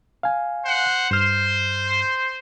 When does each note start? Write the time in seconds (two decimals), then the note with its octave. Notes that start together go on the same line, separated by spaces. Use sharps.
0.23 F5 G#5
0.66 C5 F#5
1.11 G2 C5 F6